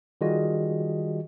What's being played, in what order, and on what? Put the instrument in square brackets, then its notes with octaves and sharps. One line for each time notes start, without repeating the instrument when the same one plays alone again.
[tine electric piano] D#3 G3 F4 F#4 G#4 D#5